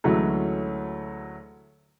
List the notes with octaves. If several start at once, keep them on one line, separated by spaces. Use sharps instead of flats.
D2 E3 F#3 G#3 A3 C#4